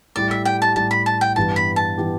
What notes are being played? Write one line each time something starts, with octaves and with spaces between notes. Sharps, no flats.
A2 G3 E4 G4 D5
E5
G5
A5
A2 G3 E4 G4 A5
B5
A5
G5
G2 E3 B3 G4 A5
B5
A5
E3 B3 G4